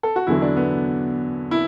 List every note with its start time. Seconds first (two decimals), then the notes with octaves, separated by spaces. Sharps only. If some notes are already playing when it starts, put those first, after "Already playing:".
0.03 A4
0.16 F#4
0.27 E2 D3 F#3 E4
0.42 D4
0.56 B3
1.51 E4